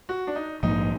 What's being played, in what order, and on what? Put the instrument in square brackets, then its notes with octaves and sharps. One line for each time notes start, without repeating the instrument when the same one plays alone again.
[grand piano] F#4
D4
D#4
[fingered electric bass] A#1 G#2 F3 A#3 [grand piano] D#4